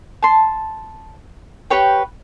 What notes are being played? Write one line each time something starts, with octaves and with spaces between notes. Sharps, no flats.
A5 C6
G4 B4 C#5 G5